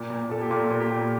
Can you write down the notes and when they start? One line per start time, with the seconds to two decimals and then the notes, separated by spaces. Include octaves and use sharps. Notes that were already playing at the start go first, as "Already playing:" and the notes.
Already playing: A#2 G4
0.10 A#2
0.30 A#2 A4
0.41 G4
0.50 A#2 F4
0.71 A#2
0.80 G4
0.90 A#2